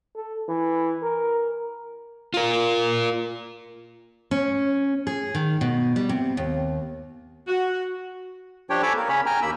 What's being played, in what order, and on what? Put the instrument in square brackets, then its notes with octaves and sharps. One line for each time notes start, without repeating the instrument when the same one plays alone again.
[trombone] A4
E3
A#4
[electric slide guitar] F4 A#4
[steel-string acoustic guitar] C#4
G#4
D#3
B2
G3
C3
D#2
[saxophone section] F#4
[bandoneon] F3 D4 G4 C#5 G5
A4 C#5 G#5 B5 D6 E6
A#3 A#4
C#3 C#4 C#5 B5
G5 G#5 A#5 F6
D#2 A#3 B5 E6